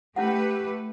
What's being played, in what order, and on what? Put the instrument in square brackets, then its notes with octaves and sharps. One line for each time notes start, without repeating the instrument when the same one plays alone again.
[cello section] A3 B4 [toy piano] C#4 E4 F#5 [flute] G4